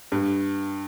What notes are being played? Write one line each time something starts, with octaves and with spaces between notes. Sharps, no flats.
G2